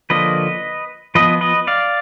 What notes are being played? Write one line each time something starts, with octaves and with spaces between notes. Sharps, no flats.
D3 F3 A#3 B4 D#5
F3 B3 B4 D#5
B4 D#5
D5 F5